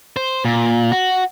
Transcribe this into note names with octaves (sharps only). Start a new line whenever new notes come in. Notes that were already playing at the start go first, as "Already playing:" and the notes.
C5
A#2
F#4